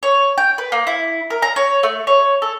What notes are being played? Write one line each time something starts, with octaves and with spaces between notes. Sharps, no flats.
C#5
G5
B4
A#3
E4
A#4
A#5
C#5
A3
C#5
A4